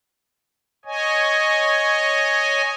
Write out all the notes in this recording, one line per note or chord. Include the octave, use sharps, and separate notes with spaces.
C#5 D#5 G#5